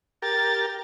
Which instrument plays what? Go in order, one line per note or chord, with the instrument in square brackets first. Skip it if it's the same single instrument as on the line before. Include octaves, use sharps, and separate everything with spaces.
[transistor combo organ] G4 A#4 [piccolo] A6